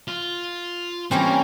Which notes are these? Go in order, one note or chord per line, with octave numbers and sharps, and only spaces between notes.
F4
E3 G3 A#3 C4 C#4